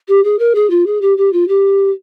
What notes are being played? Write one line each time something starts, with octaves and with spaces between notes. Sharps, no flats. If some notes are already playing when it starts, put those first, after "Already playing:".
G4
G#4
A#4
G#4
F4
G#4
G4
G4
F4
G4